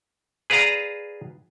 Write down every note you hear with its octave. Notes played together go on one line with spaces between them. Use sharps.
G#4 B4 D5 F5 A#5